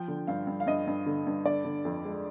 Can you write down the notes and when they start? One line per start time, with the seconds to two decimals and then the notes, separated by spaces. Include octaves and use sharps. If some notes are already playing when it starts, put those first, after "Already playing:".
Already playing: F3 G5
0.08 D3
0.27 G2 F5
0.47 G2
0.60 F5
0.67 G2 D#5
0.87 G2
1.06 D3
1.27 G2
1.45 D3 D5
1.65 D3
1.85 F2
2.05 G#3